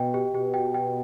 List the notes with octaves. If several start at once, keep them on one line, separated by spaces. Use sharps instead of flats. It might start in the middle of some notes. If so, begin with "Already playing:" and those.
Already playing: B2 D#5 G5
G4
B2 G4
G5
G5